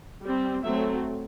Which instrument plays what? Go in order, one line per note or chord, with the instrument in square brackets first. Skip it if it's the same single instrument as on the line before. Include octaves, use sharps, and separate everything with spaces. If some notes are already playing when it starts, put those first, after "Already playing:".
[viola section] G3 C4
F#3 A3 C4 E5